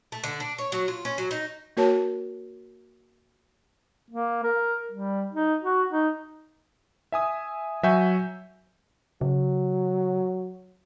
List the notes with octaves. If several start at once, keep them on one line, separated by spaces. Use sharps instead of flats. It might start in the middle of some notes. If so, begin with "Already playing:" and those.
A3
D3
D4
C#5
F#3
F4
C#4
F#3
D#4
A#3 F#4 A#4 C#5 A5
A#3
A#4
G3
D#4
F#4
D#4
E5 G#5 D#6
F#3 E5 F#5 G#5 C#6 G6
C#3 F#3